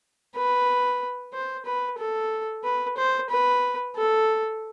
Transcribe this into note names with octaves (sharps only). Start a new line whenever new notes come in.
B4
C5
B4
A4
B4
C5
B4
A4